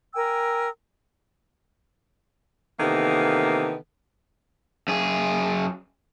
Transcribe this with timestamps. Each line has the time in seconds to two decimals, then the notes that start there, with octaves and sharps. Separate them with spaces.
0.16 A#4 G5 G#5 E6
2.80 C3 D#3 E3 A#3 B3 A4
4.88 F#2 G#4